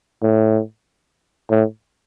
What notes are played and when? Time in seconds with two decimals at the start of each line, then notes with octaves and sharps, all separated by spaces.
0.22 A2
1.50 A2